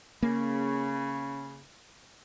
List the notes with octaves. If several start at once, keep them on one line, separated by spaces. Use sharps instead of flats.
C#3 A#3 C#4 B5